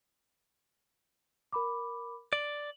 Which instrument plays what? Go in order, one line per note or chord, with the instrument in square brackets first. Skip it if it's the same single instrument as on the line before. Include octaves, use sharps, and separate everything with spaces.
[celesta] A#4 B5 D6
[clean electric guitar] D5 [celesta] F#7